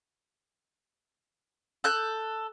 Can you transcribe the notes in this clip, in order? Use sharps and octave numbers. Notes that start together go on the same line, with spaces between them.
A4 F#6 G6